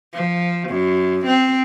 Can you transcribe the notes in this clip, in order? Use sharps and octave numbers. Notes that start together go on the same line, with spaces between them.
F3
F#2
C4